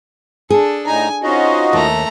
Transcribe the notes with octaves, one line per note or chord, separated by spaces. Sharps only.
D4 G#4 A4
A2 D#4 G#5 A#5
C#4 D#4 F4 F#4 C5 D#5
D#2 A3 A#5